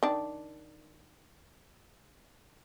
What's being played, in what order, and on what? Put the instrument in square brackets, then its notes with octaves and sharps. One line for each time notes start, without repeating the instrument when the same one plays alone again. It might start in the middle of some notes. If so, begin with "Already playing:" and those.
[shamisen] D#3 D4